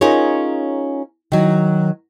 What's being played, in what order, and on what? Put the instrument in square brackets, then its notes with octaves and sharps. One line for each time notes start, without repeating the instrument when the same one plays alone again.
[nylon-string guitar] C#4 D#4 F4 G#4 A#4 C#5
D#3 F#3